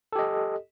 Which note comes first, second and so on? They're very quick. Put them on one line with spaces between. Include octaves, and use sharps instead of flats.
A4 G4 D#5